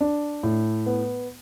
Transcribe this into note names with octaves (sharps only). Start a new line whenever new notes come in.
D4
A2
B3